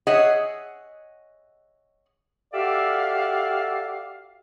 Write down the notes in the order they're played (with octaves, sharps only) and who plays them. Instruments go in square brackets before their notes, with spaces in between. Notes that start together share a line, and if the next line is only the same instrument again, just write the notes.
[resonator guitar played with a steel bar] G#4 C#5 D#5 E5 F#5
[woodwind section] F#4 G4 A4 D5 E5 F5